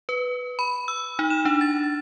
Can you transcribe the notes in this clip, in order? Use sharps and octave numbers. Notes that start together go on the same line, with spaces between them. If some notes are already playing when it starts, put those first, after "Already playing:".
B4
B5
E6
D#4
E7
D4
A6